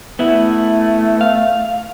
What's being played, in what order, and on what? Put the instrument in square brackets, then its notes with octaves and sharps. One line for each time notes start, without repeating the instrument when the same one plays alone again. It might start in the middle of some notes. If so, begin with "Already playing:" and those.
[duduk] A3 [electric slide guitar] B3 E4
[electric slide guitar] F5